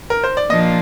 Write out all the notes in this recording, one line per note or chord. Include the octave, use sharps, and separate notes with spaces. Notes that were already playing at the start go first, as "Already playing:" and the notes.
A#4
C5
D5
A#2 F3 A#3 D4 F4 D#5